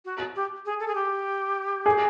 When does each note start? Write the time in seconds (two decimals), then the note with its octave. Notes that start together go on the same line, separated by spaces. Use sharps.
0.05 F#4
0.36 G4
0.66 G#4
0.80 A4
0.88 G#4
0.95 G4
1.86 G#4